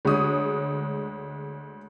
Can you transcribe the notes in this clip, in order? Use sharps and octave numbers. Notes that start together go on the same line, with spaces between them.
D2 G#3 C#5 D#6